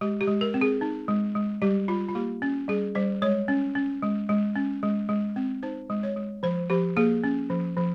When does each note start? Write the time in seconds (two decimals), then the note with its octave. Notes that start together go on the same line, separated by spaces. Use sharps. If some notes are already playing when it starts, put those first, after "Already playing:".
0.01 G#3 G4
0.21 G4
0.27 G#3
0.41 A#4
0.54 C4
0.61 G#4
0.81 D#4
1.08 G#3
1.35 G#3
1.62 G3 G4
1.88 G3 F4
2.08 F4
2.15 A#3 G4
2.42 C#4
2.68 G3 G#4
2.95 G3 C5
3.22 G#3 C#5
3.48 C#4
3.75 C#4
4.02 G#3
4.29 G#3
4.56 C#4
4.83 G#3
5.09 G#3
5.36 C4
5.63 D#4 C5
5.90 G#3
6.03 C#5
6.16 G#3
6.43 F3 C5
6.70 F3 G4
6.97 A#3 G#4
7.24 C#4
7.50 F3
7.77 F3